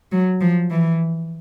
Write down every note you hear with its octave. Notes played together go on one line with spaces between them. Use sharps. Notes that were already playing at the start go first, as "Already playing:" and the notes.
F#3
F3
E3